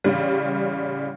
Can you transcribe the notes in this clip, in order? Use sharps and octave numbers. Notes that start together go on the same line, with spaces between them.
A1 C#3 G3